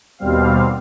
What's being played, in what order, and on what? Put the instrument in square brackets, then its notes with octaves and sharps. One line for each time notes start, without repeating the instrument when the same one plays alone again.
[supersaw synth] D#2 B2 G3 C4 F5